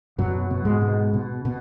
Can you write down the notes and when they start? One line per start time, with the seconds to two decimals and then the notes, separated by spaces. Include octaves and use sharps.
0.18 F#2 B2 F#3
0.51 B2
0.65 G#2 G#3
0.82 B2
1.14 B2
1.45 B2